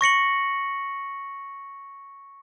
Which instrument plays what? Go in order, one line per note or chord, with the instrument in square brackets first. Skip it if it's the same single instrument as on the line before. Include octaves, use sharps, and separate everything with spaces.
[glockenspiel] C#6 A#6 C#7 F#7